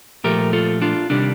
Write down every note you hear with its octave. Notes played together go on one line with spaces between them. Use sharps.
A#2 F3 A3 G4 A#4
F4 A4
D4 F4
C3 D#3 G3 D4